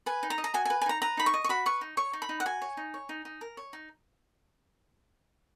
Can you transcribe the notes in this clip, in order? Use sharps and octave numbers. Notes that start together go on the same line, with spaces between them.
B4 G#5
D#4
A#5
D#5
A#5
F#4 G#5
B4 G#5
G#5
D#4 A#5
B4 A#5
D#4 B5
C#6
D#5
C#6
F#4 B5
B4 C#6
D#4
C#5 C#6
D#4
B5
D#4
F#5
F#4 G#5
C#5
D#4
C#5
D#4
D#4
A#4
C#5
D#4